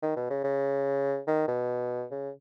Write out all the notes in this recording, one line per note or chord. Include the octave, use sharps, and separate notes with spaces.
D#3
B2
C#3
C#3
D#3
B2
C#3